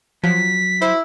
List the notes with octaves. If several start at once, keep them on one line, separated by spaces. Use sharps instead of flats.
F3 F#3 B6
E4 C5